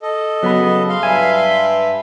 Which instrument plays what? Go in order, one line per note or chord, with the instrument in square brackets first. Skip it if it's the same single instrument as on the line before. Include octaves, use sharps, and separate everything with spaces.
[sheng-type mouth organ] A4 D#5
[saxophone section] C#3 G#3 B3 [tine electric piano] F#3 B5
[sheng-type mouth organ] F5 C6
[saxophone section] G2 B4 E5 [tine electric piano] G#5